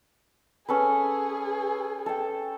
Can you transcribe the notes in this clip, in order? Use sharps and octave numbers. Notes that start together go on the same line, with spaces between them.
C#4 G#4 A4 B4
A4 G5